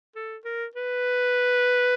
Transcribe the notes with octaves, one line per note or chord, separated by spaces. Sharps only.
A4
A#4
B4